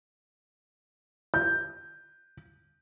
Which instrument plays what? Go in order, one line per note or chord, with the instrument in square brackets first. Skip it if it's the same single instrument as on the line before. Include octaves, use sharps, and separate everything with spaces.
[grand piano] G6